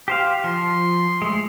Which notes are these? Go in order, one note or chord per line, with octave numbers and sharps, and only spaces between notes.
G4 C5 F5
F3 C6
G#3 A3